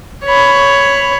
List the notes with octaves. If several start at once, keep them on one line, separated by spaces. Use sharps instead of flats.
C#5 B5